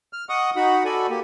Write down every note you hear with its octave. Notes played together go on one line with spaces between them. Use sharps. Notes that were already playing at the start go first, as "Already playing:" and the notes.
F6
D#5 F#5 C#6 D#6
D#4 F#4 F#5 B5
F#4 A4 D5 G#5 B5
A#3 G4